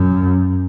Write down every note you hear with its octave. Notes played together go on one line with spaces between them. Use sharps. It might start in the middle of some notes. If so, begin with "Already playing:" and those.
Already playing: F#2